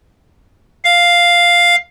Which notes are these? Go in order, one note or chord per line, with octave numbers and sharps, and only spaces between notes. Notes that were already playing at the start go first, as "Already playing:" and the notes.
F5